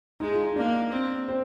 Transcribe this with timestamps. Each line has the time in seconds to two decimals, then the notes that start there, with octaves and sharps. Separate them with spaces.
0.20 G#3 D#4
0.32 F4
0.43 D#4
0.56 A#3 D4
0.92 C4
1.28 C4